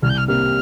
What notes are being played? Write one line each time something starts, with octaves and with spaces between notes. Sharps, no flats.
C2 F6
G6
F6
C3 G3 A#3 F6